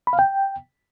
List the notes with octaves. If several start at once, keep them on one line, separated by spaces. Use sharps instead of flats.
B5
F5
G5